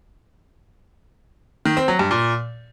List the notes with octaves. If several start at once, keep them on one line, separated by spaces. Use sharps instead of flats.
D#3
C4
F#3
G2
A#2